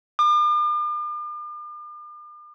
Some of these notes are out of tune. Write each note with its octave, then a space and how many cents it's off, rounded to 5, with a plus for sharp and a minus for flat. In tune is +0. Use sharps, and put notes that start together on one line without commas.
D6 +45